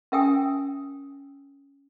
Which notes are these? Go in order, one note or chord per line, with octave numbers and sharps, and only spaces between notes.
C#4 A#4 E5 G5 G#5 D#6